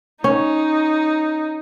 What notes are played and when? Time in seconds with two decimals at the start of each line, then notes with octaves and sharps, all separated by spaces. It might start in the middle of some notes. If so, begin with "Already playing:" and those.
0.24 C#4 D#4